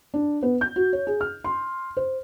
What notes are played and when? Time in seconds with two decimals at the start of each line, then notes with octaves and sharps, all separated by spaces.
0.14 D4
0.43 B3
0.61 G6
0.76 F#4
0.93 C#5
1.07 G#4
1.21 F6
1.44 C6
1.97 C5